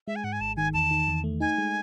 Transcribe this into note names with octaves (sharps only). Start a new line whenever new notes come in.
G#3 E5
G#5
G#2 F#5
G#5
G#1 A5
D#3 G#5
E2 A5
D#3
E2
A3
D#4 G#5
G#3